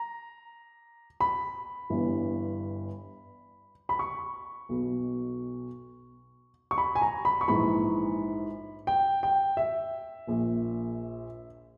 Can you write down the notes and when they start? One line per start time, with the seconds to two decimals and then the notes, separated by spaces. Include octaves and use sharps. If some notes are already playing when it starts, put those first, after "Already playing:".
Already playing: A#5
1.20 B5
1.90 G1 G2 E3
3.89 B5
3.99 C#6
4.69 B1 B2
6.71 C#6
6.78 B5
6.95 G#5
7.02 A#5
7.25 B5
7.41 C#6
7.48 A#1 G#2 E3 B5
8.87 G5
9.23 G5
9.57 E5
10.27 A#1 A#2